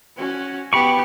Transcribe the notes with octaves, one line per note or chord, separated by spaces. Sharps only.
C#4 F#4
B3 G4 B5 C#6